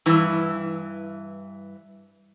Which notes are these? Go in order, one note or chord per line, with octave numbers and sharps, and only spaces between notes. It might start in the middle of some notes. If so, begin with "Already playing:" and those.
G2 E3